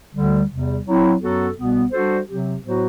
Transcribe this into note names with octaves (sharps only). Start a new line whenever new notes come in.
D2 D3 G3
E2 C3 G3
F#3 C4 E4
F#2 F#3 B3 F#4 A4
C2 B2 G3 B3
G3 D4 F#4 A4 C5
C3 F#3 C4 G4
A2 F#3 B3 F#4 C5